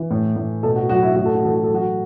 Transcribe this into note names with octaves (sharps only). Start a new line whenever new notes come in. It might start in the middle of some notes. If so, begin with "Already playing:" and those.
Already playing: E3
A2
A2
B2 A4
F#4
F#3 F#4
E4
A2 F#4
A4
F#4
E3 A4
F#4
F#3 A4
F#4